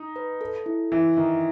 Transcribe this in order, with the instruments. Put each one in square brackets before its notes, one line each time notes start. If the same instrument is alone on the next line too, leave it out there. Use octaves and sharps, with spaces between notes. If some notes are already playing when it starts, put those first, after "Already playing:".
Already playing: [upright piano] D#4
[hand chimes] B4
A4
E4
[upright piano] E3 [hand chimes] E5
[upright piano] D#3 [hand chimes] E5